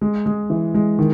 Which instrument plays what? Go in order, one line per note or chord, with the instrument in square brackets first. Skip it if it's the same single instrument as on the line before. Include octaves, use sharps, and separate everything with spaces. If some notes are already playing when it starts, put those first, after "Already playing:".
[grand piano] G#3
G#3
E3
G#3
D#3